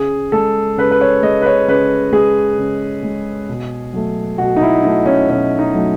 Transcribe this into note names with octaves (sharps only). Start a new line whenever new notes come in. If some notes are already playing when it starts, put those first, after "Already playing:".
Already playing: C#3 G#4
G#3 A4
C#3 B4
B4
C#5
G#3 D#5
B4
C#5
C#3 B4
G#3 G#4
C#3
G#3
B2
F#3 A3
B2 F#4
D#4
E4
F#3 A3 D#4
C#4
B2 C#4
D#4
F#3 A3